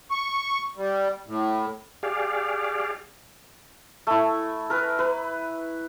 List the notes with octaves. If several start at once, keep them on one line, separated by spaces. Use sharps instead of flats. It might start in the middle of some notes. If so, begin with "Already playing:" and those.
C#6
G3
A2
G4 G#4 D5 F5
A3 E4
A#4 B4
B4